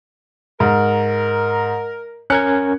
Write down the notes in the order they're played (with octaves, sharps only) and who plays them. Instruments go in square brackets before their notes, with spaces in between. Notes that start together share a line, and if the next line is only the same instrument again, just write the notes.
[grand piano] G#2 [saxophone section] A#4
[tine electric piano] C#4 A#4 G#6 [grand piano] F#6 C#7